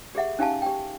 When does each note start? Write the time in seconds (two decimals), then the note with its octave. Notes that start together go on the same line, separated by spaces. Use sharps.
0.15 G4 G#4 E5 F#5
0.39 C#4 D#4 G4 F5 G#5 A5
0.62 G4 G5